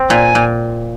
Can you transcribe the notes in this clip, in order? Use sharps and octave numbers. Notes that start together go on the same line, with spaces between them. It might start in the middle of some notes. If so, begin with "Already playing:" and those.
Already playing: C4
A#2 G#5
A#2